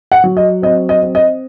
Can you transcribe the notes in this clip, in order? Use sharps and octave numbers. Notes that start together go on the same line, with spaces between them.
F#5
F#3
D#5
C4 D#5
D#5
C4
D#5